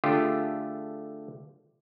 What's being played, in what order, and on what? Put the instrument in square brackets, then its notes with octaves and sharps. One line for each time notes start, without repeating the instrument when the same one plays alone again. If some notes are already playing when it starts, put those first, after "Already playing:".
[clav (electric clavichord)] D3 A3 F4 G4 G#4